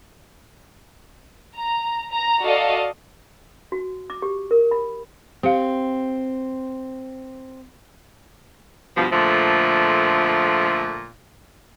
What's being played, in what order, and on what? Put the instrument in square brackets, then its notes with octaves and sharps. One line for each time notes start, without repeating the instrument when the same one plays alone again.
[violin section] A#5
A#5
F#4 A4 D5 D#5 F5
[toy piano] F#4
D6
G4
A#4
B5
[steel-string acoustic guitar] C4 [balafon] G4 F5
[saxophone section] G2 B2 F3
A#2 D3 F3 A3